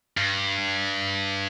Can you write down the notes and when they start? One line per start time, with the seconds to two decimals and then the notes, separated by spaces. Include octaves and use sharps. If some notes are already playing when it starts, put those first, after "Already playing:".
0.17 G2